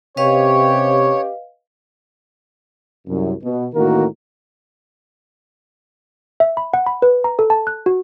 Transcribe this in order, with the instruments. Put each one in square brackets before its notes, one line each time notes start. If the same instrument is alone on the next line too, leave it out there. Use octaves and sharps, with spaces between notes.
[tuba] C3 [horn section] C#4 G4 [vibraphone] B4 D#5 F5 [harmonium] C#5
[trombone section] C2 F#2
B2
A1 A2 D#3 A#3 F#4 A#4
[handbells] E5
B5
F#5
B5
B4
A#5
A4
A5
F#6
F#4